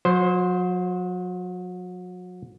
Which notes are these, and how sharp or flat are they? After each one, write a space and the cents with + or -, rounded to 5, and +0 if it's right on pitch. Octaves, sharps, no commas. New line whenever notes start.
F#3 -35 C5 +0